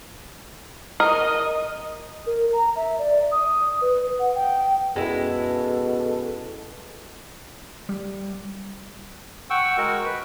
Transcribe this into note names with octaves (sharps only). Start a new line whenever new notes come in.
A#4 D#5
A#4
A#5
E5
D5
D#6
B4
F#5
G5
F#2 B2 G#3 E4 A4
G3
F#5 G5 C#6 E6
G#3 F#4 A#4
B4